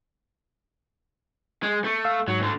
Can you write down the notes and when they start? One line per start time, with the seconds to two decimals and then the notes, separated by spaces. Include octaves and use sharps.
1.63 G#3
1.84 A3
2.04 F5 E6
2.28 G#2 F#3
2.39 D2 D3